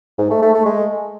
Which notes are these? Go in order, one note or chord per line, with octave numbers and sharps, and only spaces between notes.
G#2
A3
A3
A3
G#3